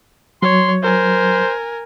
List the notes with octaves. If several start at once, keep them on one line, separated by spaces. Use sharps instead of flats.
F#3 C#5 C6
A#4 C5 G#5